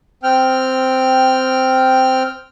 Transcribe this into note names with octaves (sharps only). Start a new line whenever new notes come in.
C4 G5 F6